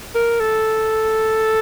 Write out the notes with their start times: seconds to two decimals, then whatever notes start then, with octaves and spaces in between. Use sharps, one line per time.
0.15 A#4
0.40 A4